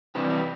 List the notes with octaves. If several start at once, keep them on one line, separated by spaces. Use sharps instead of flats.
C3 E3 G3 G4 B4
G4 B4